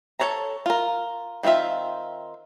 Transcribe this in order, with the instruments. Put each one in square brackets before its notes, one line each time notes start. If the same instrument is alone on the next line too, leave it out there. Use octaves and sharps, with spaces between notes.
[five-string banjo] A4 B4 C#5 A5 A#5
F4 A#4
D#3 A#3 C4 F4 E5